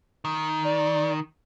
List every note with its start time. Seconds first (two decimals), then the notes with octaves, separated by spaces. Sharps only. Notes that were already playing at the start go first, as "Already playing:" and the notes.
0.25 D#3
0.64 D5